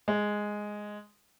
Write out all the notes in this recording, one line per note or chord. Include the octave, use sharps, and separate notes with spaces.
G#3